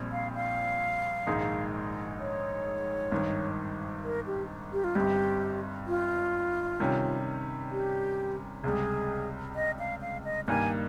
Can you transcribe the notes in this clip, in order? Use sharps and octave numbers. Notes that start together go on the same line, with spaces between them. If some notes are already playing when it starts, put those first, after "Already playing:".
Already playing: A#1 A#2 G3 C4
F5
F5
A#1 G#2 D#3 G#3 D#4
C#5
G#1 G2 D#3
A#4
G4
G4
F4
G1 G2 G3 C4 D#4 G4
F4
C3 D#3 G3 C#4
G4
C#2 C3 G3 G#4
D#5
F5
F5
D#5
G2 D#3 G3 A#3 G#5